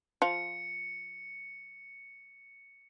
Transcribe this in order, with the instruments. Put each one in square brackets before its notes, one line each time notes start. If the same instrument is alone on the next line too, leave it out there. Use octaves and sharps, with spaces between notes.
[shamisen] F3 F4 [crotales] C#7